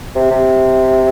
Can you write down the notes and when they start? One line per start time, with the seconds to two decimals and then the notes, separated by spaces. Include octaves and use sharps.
0.16 C3
0.31 C3